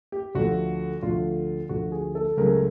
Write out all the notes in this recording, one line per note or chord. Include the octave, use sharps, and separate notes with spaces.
G4
D2 D3 F3 A3 F#4
D2 D3 F3 A3 F4
D2 D3 F3 A3 F#4
G#4
A4
C#2 C#3 F#3 A3 A#4